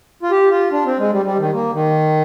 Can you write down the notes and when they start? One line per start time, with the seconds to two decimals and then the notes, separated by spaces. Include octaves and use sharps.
0.23 F4
0.31 G4
0.51 F4
0.71 D4
0.85 C4
0.99 G#3
1.12 G3
1.26 G3
1.39 D#3
1.53 A#3
1.73 D#3